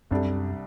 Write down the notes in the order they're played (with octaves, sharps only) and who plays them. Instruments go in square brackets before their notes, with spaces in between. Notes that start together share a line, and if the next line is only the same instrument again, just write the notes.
[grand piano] C2 C3 G3 D4 A4 [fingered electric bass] F#2